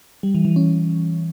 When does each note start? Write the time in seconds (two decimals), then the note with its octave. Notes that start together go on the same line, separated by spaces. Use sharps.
0.23 G3
0.35 E3
0.45 E3
0.56 C#4